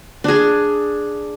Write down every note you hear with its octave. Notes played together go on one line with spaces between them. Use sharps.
D4 G#4